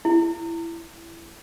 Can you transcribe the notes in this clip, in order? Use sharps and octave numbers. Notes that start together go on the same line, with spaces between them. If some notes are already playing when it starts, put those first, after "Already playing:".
E4